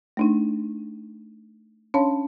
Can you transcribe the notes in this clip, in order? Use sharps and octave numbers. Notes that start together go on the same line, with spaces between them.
A3 D4 D#4
C#4 D4 C#5 F5 A5 C6